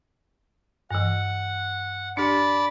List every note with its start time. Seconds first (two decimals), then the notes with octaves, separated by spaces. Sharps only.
0.91 G2 E3 F#5
2.17 D4 G4 D5 A5 B5